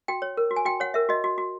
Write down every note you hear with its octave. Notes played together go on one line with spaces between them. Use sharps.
F#4 G5
C#5
A#4
F#4
G#5
F#4 G5
C#5 F#5
A#4 E5
F#4 D#5
F#4
F#4